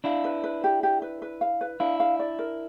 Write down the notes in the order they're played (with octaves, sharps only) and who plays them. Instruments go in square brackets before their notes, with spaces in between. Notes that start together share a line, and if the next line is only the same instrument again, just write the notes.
[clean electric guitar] D4 E4 [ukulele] F5
[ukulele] B4
B4
G4
G4
B4
B4
F5
B4
[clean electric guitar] D4 E4 [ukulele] F5
[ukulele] F5
D5
A#4